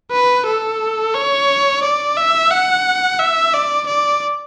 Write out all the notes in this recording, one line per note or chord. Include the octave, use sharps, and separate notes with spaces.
B4
A4
C#5
D5
E5
F#5
E5
D5
D5